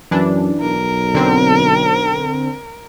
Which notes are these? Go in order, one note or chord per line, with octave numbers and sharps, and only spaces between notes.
F#2 E3 D4
B1 A#4
D3 C4